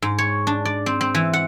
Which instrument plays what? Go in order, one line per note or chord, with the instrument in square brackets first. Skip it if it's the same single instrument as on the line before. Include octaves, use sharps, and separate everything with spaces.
[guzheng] G#2
C#5
D4
D5
C4
C4
E3
F#5